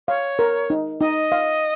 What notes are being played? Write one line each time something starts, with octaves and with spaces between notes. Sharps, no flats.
C#5 F5
A#4
D#4
D#4 D#5
F5